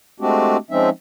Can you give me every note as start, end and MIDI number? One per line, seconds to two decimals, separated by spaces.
0.20 0.57 56
0.20 0.57 57
0.20 0.57 60
0.20 0.57 62
0.20 0.57 66
0.20 0.57 67
0.71 0.90 53
0.71 0.90 56
0.71 0.90 60
0.71 0.90 61
0.71 0.90 63
0.71 0.90 76